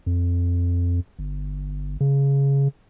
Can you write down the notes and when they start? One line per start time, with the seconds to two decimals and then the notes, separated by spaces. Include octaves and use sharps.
0.06 F2
1.19 G1
2.01 C#3